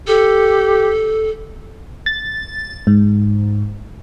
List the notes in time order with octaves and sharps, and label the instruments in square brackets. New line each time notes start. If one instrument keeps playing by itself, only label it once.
[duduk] G4 [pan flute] A4
[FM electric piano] A6
G#2